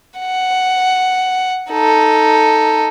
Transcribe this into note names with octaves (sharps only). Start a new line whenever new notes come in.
F#5
D#4 A4